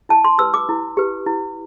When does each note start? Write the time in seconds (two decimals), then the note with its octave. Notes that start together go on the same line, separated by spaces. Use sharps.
0.09 E4 A5
0.25 C6
0.38 G4 B4 E6
0.54 D6
0.69 E4
0.97 G4 B4
1.26 E4